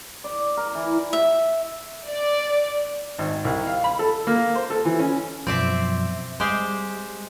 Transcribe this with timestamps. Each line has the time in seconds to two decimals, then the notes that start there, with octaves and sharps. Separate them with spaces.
0.24 D5
0.57 A#4
0.75 E3
1.13 E5
2.07 D5
3.18 G#1
3.45 C2
3.67 F5
3.84 B5
3.99 A4
4.27 A#3
4.55 C5
4.70 A4
4.85 E3
4.99 C#4
5.47 F#2 B2 F3 C4 D5 E5
6.40 G3 G#3 G4 C5